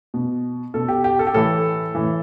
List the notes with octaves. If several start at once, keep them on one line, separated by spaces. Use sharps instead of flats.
B2
B2 A4
G4
G4
A4
G4
A2 E3 A4
A2 E3